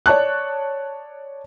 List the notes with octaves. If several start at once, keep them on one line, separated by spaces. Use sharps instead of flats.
C#5 D5 A5 C#6 F#6